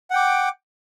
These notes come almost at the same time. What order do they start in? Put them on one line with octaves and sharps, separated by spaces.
F#5 G5 D6